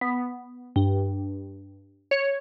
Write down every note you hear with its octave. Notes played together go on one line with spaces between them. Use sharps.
B3
G2
C#5